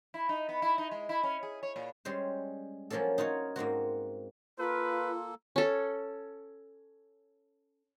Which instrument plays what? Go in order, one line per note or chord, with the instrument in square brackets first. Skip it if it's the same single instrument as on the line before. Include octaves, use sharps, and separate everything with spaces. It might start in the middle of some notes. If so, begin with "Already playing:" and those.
[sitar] E4
D#4
B3
E4
D#4
G#3
E4
C#4
G#4
C#5
A#2
[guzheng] G3 G#3 C#4 C5
F3 F#3 A#3 C#4 A4
D#4 F4 F#4 C#5
G#2 A#3 C4 F#4
[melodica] A#3 A4 [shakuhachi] F4 [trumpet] B4
[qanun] C#4 A4